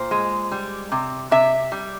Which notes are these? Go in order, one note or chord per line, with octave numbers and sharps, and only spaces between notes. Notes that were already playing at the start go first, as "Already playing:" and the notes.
Already playing: A#2 C5
G#3
G3
C3
C3 E5
G3